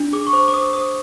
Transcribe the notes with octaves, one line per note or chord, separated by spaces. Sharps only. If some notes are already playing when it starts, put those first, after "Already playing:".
Already playing: D4
G#4 D6
C#6
C5 D6
D6
C5 D#6
C5 D#6